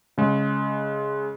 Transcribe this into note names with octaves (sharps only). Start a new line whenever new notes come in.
C#3 G#3